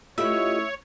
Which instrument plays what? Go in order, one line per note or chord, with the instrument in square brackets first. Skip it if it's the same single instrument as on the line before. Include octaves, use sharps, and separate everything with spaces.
[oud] A3 C#4 E4 [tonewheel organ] F4 G4 D#5 [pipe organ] C#5 [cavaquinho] E5